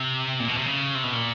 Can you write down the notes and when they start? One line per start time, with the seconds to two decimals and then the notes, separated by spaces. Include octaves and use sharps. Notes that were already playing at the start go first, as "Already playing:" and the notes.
Already playing: C3
0.40 A#2
0.48 B2
0.57 C3
0.66 C#3
0.95 C3
1.04 B2
1.13 A#2